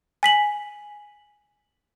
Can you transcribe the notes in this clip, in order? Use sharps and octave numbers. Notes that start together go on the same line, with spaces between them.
G#5 B6 F#7